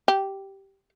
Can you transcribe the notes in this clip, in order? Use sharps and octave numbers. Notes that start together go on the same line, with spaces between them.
G4